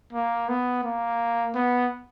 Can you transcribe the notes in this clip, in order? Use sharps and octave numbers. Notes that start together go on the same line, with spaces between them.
A#3
B3
A#3
B3